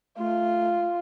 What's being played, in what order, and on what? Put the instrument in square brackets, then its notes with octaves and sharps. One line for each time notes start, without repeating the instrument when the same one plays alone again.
[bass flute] A3 [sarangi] F4